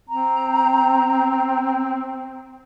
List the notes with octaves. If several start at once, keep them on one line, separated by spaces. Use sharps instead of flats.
C4 A#5